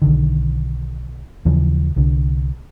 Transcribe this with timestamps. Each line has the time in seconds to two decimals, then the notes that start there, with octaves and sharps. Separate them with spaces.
0.02 B1 D3 D#3
1.45 D#2 C#3 E3 F3
1.96 C2 D3